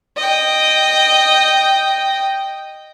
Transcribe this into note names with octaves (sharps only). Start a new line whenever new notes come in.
D#5 G5